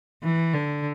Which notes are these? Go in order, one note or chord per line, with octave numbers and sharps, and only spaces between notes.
E3
D3